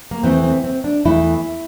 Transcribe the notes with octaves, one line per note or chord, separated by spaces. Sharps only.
A#3
E2 E3 A3 C4
C4
C4
D4
E2 E3 A3 E4